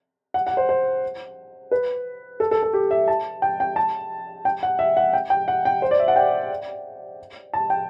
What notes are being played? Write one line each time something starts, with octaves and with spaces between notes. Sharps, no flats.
F#5
F#5
C5
C5
B4
A4
A4
A4
G4
E5
A5
G5
G5
A5
G5
F#5
E5
F#5
G5
G5
F#5
G5
C5
D5
E5
F#5
G5
A5
G5